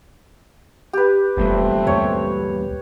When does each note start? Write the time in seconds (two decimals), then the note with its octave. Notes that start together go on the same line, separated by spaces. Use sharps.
0.93 G4 B4
1.37 F1 E2 G2 A#2 A3 C4
1.87 D2 C#5